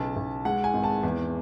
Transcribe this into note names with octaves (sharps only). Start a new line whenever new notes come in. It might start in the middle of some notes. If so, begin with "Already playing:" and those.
Already playing: B1 C#3 A5
B1
G#3 F#5
G#5
G#1
A5
E2